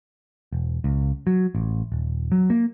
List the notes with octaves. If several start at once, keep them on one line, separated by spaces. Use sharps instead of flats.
E1
C#2
F#3
A1
D#1
F#3
A#3